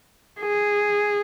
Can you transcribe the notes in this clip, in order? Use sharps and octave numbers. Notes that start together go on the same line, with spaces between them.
G#4